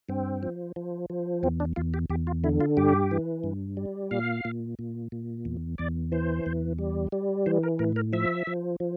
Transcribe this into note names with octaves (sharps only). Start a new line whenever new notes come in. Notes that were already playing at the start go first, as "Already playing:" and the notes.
G2 C4
F3
F3
F3
E2 C4
D4
E2 F4
G4
E2 G4
F4
D3 E4
F4
G2 G4
E3
G2
G3
A#2 F5
A#2
A#2
A#2
E2
E2 D5
E3 C5
E2
G3
G3
E3 C5
A#4
A2 A#4
A#4
F3 E5
F3
F3